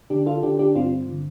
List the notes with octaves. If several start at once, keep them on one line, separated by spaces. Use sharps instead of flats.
D3 D4 G4
F4 A4
D3 D4 G4
D4 G4
G2 C4 F4
D3